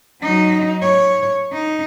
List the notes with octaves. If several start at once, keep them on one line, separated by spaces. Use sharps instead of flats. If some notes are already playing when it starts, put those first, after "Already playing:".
F#3 D#4
C#5
D#4